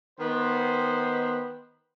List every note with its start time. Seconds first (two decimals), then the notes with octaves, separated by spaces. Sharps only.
0.20 D#3 B3 C5